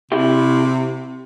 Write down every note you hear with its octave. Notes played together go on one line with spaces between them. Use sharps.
C3 E4 G4